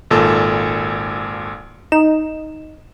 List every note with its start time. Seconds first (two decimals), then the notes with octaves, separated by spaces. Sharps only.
0.11 G#1 A#2 A4
1.92 D#4 E7